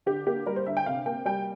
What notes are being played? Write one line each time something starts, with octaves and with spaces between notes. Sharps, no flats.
D3 G4
A#3 G4
G3 A#4
C5
D3 E5
G5
C3 F5
A#3 G5
G3 G5